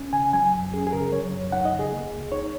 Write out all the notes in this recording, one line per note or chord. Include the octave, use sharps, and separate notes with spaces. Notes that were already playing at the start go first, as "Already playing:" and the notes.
Already playing: C#4
C#3 G#5
F#3 G#5
F#2
C#4 G#4
G#4
C#3 A#4
F#3 C#5
F#2
D#4 F#5
D#5
C#3
G#4
A#3
C#2
D#4 C#5